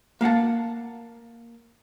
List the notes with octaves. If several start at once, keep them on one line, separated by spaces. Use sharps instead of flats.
A#3 F5 F#5 A5